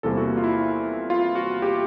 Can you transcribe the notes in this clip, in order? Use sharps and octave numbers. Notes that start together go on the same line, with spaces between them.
E2 C3 E3 G3 A#3 A4
F#4
F4
E4
F4
F#4
G4